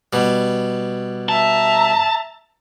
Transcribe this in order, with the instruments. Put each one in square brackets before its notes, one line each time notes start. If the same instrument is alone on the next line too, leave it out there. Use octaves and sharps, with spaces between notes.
[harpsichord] B2 G3
[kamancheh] E5 A#5 [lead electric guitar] A5